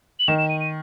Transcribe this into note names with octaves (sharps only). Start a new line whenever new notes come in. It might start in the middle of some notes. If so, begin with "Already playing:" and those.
F#7
D#3 E7
E7
D#7
D#7